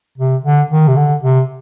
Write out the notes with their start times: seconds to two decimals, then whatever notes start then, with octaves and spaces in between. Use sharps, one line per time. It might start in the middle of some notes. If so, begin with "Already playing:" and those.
0.18 C3
0.44 D3
0.71 D#3
0.88 C3
0.96 D3
1.23 C3